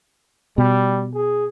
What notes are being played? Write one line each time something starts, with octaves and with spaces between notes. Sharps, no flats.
B2 G3
G#4